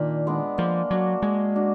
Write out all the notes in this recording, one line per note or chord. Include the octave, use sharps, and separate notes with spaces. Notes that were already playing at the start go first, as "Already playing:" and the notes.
Already playing: A#2 D#3 D4
G#3 B3 D4
F3 A#3
F#3 D4 F#4
G#3 A#3
D4 F#4